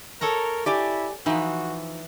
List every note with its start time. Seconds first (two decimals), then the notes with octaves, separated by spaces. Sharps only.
0.21 A4 A#4 C#5 A#5
0.66 E4 G4 D5 G#5
1.26 E3 F3 D#4 F#4